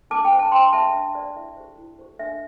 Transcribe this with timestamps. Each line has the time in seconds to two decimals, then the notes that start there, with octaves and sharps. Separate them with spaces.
0.10 D4 A5 D6
0.25 G5
0.32 C5
0.39 A5
0.52 D4 G5 C6
0.73 G4 C5 E5 A5
0.94 D4 E5
1.15 G4 C5 D5
1.35 E4 E5
1.57 G4 C5
1.78 E4
1.99 G4 C5
2.19 D4 E5